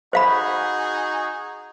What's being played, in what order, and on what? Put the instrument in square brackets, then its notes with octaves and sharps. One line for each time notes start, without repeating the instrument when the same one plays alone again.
[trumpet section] D#4 F#4 G#4 [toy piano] C5 F5 B5